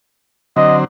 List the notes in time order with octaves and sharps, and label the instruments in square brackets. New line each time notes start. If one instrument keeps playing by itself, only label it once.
[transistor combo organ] D3 F#3 C4 [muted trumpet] D#5